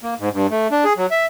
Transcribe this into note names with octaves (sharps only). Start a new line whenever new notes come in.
A#3
G#2
G2
A3
D4
G#4
F#3
E5